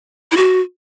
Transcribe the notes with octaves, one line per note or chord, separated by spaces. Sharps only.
E4
F#4